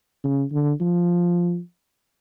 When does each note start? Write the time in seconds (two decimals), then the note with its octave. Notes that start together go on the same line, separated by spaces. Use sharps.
0.24 C#3
0.52 D3
0.81 F3